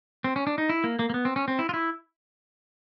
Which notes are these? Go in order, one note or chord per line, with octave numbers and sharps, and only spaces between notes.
C4
C#4
D4
D#4
E4
A#3
A#3
A#3
B3
C4
C#4
C4
E4
F4
E4